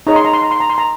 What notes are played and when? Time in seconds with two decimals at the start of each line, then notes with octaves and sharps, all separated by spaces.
0.07 D#4 G#4 C#5 A#5
0.16 C6
0.25 A#5
0.33 C6
0.42 A#5
0.51 C6
0.60 A#5
0.70 C6
0.78 A#5